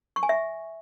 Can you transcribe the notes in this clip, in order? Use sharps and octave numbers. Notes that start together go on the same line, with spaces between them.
C#6
G#5
E5